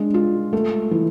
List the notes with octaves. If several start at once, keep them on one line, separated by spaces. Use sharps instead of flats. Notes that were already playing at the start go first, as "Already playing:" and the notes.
Already playing: G#3 D4
F4
A3
E3